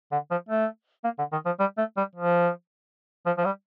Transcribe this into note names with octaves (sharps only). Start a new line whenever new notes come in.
D3
F3
A3
A#3
D3
D#3
F3
G3
A3
G3
F3
F3
F3
G3